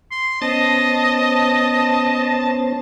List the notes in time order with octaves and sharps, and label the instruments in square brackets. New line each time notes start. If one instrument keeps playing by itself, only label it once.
[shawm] C6
[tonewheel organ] B3 C#4 C5 [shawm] D#5 [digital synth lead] A5